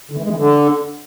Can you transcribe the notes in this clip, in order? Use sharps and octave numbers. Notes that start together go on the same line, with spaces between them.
D3
E3
G#3
E3
D3